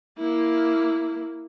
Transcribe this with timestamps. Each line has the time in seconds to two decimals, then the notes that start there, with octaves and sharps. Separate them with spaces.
0.18 A#3 E4